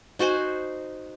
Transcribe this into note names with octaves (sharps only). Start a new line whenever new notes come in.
D#4 F#4 C5 G#5